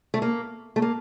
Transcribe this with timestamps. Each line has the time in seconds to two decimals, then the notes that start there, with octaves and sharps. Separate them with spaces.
0.14 A3
0.22 A#3
0.76 A3
0.82 A#3